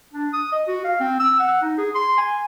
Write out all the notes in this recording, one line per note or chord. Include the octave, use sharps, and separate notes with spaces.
D4
D#6
D#5
F#4
F5
C4
E6
F#5
D#4
G#4
C6
G#5